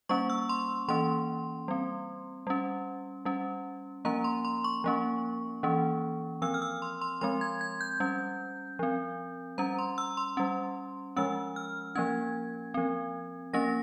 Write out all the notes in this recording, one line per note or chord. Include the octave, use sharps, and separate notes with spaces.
G3 A#3 C#4 C#6
E6
C6
E3 A#3 C#4 C6
G3 C4
G3 C#4
G3 C#4
F3 A#3 C#4 A#5
C6
C6
C#6
F3 A#3 C#4
E3 A#3 C#4
F3 C4 E6
F6
E6
C6
C6
F3 G#3 C4 C6
G#6
G#6
G6
G3 C#4
F3 C4
G3 C#4 A#5
C6
E6
C6
G3 C#4
F3 G#3 C#4 E6
F6
F3 A#3 C#4 G#6
F3 C4
F3 A#3 C#4 A#6